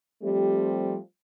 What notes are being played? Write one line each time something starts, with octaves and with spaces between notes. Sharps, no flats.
F3 G3 A3 C4 G4